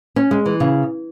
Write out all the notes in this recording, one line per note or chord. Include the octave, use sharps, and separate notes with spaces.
C#4
G#3
E3
C#3